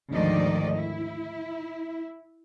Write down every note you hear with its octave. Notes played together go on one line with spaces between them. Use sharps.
D2 G#2 D#3 F3 D5 D#5
E4